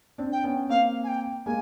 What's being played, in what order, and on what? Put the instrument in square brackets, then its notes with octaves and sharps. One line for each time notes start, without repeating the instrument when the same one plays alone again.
[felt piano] C4 D4
[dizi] G5
[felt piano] B3 C#4
[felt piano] A#3 C4 [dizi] F5
[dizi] G#5
G5
[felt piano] G#3 A#3 [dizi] G#5